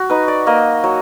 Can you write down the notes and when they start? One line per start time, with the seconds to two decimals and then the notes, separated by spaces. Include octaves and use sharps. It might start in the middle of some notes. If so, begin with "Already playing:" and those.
Already playing: F#4
0.10 D#4 B4
0.28 D5
0.47 A#3 D#5
0.84 F#3